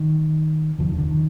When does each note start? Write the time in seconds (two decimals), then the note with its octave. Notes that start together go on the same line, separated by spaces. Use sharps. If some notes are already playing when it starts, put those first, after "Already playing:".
Already playing: D#3
0.79 F1 D#2 D3 F3
0.89 D#3
0.98 D3
1.07 D#3